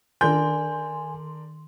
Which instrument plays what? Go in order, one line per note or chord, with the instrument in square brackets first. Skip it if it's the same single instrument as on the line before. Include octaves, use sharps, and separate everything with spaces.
[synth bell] D#3 C6 [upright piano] D4 A#4 G6 [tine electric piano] G#5